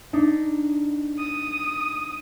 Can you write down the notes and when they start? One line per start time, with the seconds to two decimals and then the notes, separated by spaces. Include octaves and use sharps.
0.13 D4 D#4
1.19 D#6